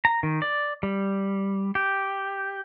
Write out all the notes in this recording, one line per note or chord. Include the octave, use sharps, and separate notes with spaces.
A#5
D#3
D5
G3
G4